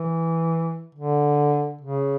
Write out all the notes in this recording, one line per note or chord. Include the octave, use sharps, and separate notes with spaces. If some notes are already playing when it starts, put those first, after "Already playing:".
Already playing: E3
D3
C#3